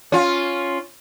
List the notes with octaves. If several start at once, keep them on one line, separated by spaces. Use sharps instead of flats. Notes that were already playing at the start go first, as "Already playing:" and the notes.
C#4 F4